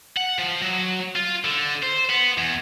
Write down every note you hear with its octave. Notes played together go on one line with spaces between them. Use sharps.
F#5
F3
F#3
F4
D3
C5
B3
E2